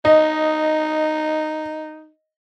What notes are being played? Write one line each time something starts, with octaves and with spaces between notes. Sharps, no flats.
D#4 D#5